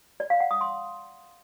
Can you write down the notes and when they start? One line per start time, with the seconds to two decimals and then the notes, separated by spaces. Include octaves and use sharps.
0.20 D5
0.30 F5
0.40 F#5
0.51 D#6
0.61 C6